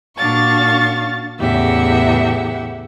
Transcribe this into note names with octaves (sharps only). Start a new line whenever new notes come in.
A#2 D4 F#4 F5 C#6 A6
E2 A2 C#3 G4 E5 F#5